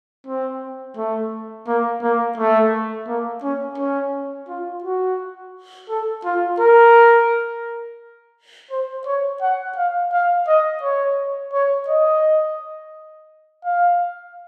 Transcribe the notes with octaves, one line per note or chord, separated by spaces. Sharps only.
C4
A3
A#3
A#3
A3
A#3
C#4
C#4
F4
F#4
A4
F4
A#4
C5
C#5
F#5
F5
F5
D#5
C#5
C#5
D#5
F5